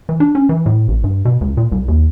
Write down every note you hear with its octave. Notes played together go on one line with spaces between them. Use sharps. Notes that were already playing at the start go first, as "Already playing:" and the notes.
E3
D4
C#4
E3
A2
A1
G2
B2
C#2
A#2
C2
D#2